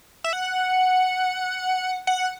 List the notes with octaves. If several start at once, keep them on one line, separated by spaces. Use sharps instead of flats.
E5
F#5
F#5